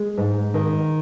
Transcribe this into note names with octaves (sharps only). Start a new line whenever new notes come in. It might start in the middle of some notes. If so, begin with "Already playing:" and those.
Already playing: G#3
G#2
D#3